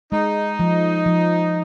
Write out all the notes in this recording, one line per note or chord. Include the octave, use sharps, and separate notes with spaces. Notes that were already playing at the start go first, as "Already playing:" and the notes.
G#3 D#4
F3
F3